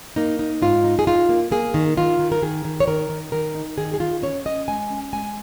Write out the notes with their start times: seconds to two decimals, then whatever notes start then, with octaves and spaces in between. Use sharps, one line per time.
0.16 A#3 D#4
0.39 D#4
0.62 G#2 F4
0.84 D#4
0.99 G#4
1.07 D#4 F4
1.29 A#3
1.51 A#3 G#4
1.74 D#3
1.97 D#3 F4
2.19 D#3
2.32 A#4
2.42 D#3 G#4
2.65 D#3
2.80 C#5
2.87 D#3 A#4
3.09 D#3
3.32 D#3 A#4
3.55 D#4
3.78 D#3 G#4
3.94 G#4
4.00 D#3 F4
4.23 C#4 C#5
4.45 C#4 D#5
4.68 G#3 G#5
4.90 C#4
5.13 G#3 G#5